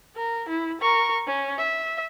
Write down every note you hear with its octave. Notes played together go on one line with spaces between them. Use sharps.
A#4
E4
A#4 C#6
C#4
E5